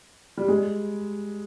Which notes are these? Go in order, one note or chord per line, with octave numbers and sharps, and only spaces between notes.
G3
G#3